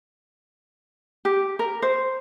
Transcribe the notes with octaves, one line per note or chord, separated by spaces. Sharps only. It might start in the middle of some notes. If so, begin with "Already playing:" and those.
G4
A#4
C5